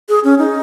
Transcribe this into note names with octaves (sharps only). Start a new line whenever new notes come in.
G#4
C#4
D#4